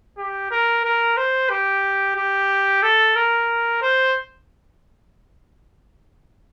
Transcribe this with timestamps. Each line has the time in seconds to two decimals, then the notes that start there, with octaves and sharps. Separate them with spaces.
0.18 G4
0.51 A#4
0.84 A#4
1.17 C5
1.50 G4
2.16 G4
2.83 A4
3.16 A#4
3.82 C5